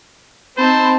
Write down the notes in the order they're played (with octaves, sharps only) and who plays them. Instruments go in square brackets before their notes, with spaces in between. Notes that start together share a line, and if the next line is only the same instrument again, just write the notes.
[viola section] C4 [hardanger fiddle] D#4 A5 [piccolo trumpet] C5 [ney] B5